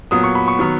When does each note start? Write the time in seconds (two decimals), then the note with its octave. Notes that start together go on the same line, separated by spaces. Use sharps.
0.11 A#2 F#3 B3 D#6
0.24 C#6
0.35 B5
0.48 C#6
0.59 D#3 F#3 B3